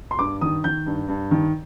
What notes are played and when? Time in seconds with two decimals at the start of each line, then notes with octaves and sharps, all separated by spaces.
0.11 C6
0.19 G2 D6
0.41 D#3 D#6
0.64 D#3 G6
0.86 G2
1.08 G2
1.31 D#3